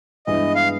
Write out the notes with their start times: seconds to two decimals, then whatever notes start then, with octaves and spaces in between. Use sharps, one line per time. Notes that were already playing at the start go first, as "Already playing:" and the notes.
0.27 G2 E3 G#3 B3 E4 D#5
0.55 F5